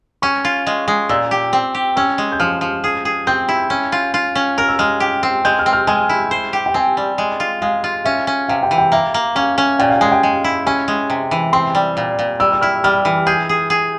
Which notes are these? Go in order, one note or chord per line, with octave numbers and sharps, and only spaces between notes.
C#4 C#6
F4
G#3
G#3
A#2 E6
G4
C4
G4
C#4 E6
G#3
G6
F3 F6
F3
G#4
G#4
C4 G6
E4
C#4
F4
F4
C#4
A#4 F6
E6
G#3 F6
G4
C4
G#3 G6
F6
C4
F6
G#3 G#5
E4
C5
G4
G5
C4 G#5
G3
G#3
F4
G#3 F5
F4
C#4 E5
C#4
C3 F5
G5
E3
G5
A#3 E5
A#3
C#4 F5
C#4
A#2 G5
F5
G#3 G#5
G5
G#3
E4
C#4 G#5
G#3
C3
E3
C4 C6
G3
A#2
A#2
G3 E6
E6
E4 F6
G3 F6
E3
G#4 G6
G#4
G#4